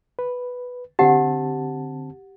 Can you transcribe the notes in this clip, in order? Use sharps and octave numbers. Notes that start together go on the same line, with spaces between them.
B4
D3 C4 G4 F#5 A5